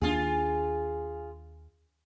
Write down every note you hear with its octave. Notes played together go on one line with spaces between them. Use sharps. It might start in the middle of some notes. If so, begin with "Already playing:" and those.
D#2 D4 F4 G#4